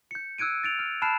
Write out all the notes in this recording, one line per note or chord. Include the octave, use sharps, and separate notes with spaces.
G6 C#7
E6 F#6 G#6 D7 D#7
A6 D7 F7
F6
A5 B5 F6 F#6 C7 E7